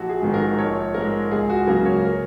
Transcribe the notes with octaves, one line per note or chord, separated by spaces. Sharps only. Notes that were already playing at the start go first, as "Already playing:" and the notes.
Already playing: A#1 F#4
G#4
G#2 D#3
A#4
A#1 C#5
G#2 G#3 A#4
C#2 G#4
F#4
C#3 F#3 A#3 A#4
C#5
A#4